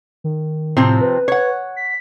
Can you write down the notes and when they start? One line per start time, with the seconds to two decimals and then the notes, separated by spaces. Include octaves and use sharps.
0.24 D#3
0.77 A2 C3 F3 C4
1.01 B4
1.28 C#5 F#5
1.76 B6